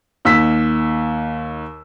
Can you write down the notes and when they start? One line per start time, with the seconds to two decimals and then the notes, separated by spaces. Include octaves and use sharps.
0.25 D#2 E6 B6